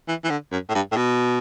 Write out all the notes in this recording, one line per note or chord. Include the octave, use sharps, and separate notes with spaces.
E3
E3
D3
F#2
A2
G2
A2
B2